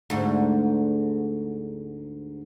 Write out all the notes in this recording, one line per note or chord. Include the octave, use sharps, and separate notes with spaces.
D2 G#2